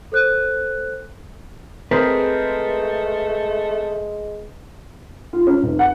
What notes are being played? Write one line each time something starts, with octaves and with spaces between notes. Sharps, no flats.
A4 C5 F#6
G#3 A3 C4 G#4 A#4 B4
F4
C#4
F1
F#5